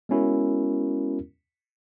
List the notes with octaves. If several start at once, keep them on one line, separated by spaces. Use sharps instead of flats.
G#3 B3 C#4 E4 F#4 A#4